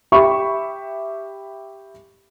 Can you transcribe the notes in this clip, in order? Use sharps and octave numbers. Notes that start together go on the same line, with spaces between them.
G4 E5 B5 C#6